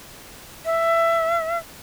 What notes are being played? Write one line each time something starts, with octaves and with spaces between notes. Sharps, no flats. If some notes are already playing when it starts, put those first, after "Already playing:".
E5